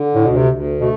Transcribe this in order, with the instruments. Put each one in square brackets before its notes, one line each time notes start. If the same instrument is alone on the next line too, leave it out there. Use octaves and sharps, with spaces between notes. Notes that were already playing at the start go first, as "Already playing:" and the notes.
Already playing: [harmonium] D3
[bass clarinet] A2
[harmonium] D2 [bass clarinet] B2
[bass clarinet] C3
[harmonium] D2
[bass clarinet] B2 [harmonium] A3